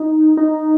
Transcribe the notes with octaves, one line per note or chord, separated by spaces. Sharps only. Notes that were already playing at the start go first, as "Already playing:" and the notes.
Already playing: D#4
D#4